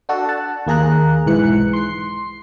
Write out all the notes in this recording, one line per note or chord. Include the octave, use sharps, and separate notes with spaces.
D4 F#4 A4
F#5 A5
D#2 A#3 G#4 A#5 F#6
B1 G#2 E3 F#6 C#7
C6 C7